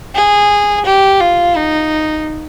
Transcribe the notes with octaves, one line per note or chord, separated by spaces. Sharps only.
G#4
G4
F4
D#4